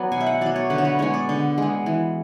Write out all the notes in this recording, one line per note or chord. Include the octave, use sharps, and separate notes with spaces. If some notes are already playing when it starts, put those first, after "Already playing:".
Already playing: F#3 B3 D5
B2 G#5
E5
F#5
F#3 B3 D5
C#5
D3 B4
C#5
B4
G#3 B3 C#5
D5
D3
G#3 B3
E3